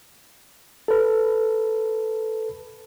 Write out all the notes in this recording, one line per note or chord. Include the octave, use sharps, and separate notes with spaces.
A4 B4